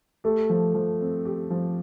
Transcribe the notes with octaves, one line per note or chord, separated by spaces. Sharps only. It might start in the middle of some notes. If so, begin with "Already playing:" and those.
A3 G4
F3
F3
C4
G4
F3